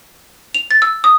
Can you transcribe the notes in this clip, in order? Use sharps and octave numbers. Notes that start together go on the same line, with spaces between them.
F7
A6
E6
D#6